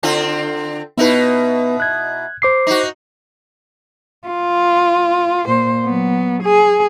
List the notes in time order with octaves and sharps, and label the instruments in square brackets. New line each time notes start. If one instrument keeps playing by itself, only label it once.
[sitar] D3 C4 F4
[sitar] B2 D#4 E4 [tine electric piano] B3 B4
[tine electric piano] F#6 G#6
C5 D6 C7
[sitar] D#4 F#4
[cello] F4
A#2 C5
F#3 B3
G#4